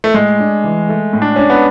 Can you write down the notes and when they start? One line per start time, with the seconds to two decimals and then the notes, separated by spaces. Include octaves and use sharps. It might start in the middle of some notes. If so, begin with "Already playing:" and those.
0.04 A3
0.14 A2 G#3
0.39 D4
0.64 E3
0.89 A3
1.13 A2
1.22 D4
1.36 C#4 D4
1.50 B3